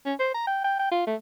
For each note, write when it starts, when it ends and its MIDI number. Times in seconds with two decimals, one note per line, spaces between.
0.06 0.14 61
0.19 0.31 72
0.34 0.46 82
0.47 0.64 79
0.64 0.77 79
0.79 0.90 79
0.92 1.06 65
1.07 1.15 57